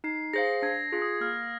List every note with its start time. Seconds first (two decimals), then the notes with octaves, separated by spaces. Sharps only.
0.04 D#4 C7
0.33 G#4 C5 F5 A#6
0.62 D4 G#6
0.92 F4 G#4
1.02 D#6
1.21 A#3 F6